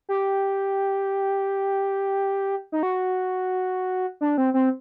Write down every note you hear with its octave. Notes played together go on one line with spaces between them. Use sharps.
G4
D#4
F#4
D4
C4
C4